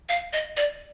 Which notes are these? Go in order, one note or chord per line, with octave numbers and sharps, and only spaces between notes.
F5
D#5
D5